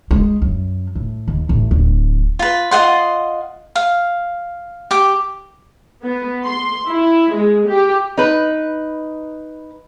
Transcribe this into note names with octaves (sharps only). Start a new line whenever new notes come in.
G#3
F#2
A2
D#2
A1
D1
F4 B4
F4 D#5 F#5 C6
F5
G4 D6
B3
C6
E4
G#3
G4
D#4 B4